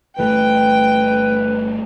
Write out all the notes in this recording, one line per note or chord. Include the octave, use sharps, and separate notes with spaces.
G1 E3 A3 B4 G5